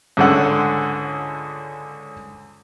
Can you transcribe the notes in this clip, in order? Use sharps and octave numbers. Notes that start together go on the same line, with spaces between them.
C#2 G#2 D3 C#4 F#5 E6